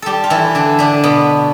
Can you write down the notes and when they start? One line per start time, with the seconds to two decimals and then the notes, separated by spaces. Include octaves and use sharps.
0.02 G3 G4 A4
0.24 F4
0.30 E3 E4
0.55 D3 D4
0.79 D3 D4
1.04 B2 B3